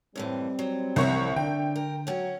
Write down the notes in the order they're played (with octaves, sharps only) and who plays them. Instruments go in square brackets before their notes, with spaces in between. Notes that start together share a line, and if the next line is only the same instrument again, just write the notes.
[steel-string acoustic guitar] F#2 A2 E3 [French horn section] G3 C4
[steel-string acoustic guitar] F#3
[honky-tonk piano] C2 C#5 [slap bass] C3 E3 F3 [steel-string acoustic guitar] A#4 E5
[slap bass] D3 [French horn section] D4 [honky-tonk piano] G5
[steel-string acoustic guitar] A#4
[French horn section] F#3 [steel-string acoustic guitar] C#4 F#4